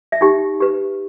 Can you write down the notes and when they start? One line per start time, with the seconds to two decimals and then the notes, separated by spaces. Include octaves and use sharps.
0.12 E5
0.21 D#4 G4 G5
0.60 G4 B4